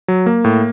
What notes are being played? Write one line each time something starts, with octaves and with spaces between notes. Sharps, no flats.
F#3
A#3
A2